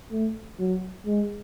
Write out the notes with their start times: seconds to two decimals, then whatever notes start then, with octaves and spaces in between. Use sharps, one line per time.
0.12 A3
0.59 F#3
1.06 G#3